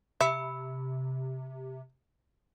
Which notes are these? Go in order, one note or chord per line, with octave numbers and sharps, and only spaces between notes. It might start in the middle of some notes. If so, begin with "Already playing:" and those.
C3 E5 B5 E6 C#7